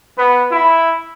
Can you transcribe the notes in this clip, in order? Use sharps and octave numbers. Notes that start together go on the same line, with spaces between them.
B3
E4